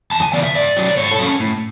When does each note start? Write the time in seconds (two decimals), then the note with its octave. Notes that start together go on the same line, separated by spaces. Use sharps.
0.11 E2 A5
0.22 G#5
0.33 C#3 E3 B3 D5
0.43 E5
0.55 G#2 D5
0.77 F#3 C#4
0.97 G#2 C#5
1.11 A4
1.19 F#3 C#4
1.40 A2